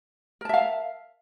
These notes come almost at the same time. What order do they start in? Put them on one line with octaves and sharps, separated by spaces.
A#4 A5 E5 F5